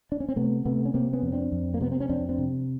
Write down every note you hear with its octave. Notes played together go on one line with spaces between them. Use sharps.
D4
C#4
C4
C3 A3 B3
C3 A3 B3
C#4
C3 A#3 C4
B3 C#4
F2
C#4
C4 D4
F2
A#3
C3 B3
C4
C#4
F2 C4 D4
C4 D4
C3